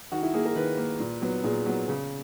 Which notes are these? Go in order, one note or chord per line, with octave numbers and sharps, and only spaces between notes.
D#3 F#4
E4
A#3 G#4
A#4
D#3 B4
A#3
A#2
F#3 B3
A#2 G#4
F#3 B3
C#3